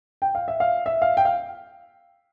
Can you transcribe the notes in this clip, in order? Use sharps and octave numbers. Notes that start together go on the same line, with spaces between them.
G5
F5
E5
F5
E5
F5
G5
F5